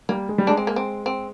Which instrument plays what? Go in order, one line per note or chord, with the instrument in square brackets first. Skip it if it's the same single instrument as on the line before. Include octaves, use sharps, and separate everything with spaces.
[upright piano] G3 [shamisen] A#3
[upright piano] G#3
G3
[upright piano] G#3 [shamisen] D4
[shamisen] C4
A#3
C4
C4